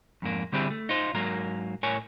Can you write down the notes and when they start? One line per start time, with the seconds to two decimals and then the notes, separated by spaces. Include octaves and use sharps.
0.22 F2 G#2 A#3
0.52 D3 G3 C4 E4 G4 G#4
0.70 A3
0.89 D#4 F4 C5
1.14 G#2 F#3 A#3 A#4
1.83 A2 A#4 C#5 G#5